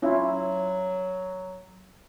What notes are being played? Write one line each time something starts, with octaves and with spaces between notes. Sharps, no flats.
F#3 C#4 E4 F4